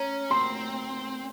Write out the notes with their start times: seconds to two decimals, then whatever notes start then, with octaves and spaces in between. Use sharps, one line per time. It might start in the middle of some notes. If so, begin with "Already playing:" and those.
Already playing: C#4 A#5
0.31 C4 C6